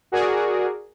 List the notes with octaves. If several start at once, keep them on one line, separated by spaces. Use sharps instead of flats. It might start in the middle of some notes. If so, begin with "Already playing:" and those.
F#4 G#4 A#4 D5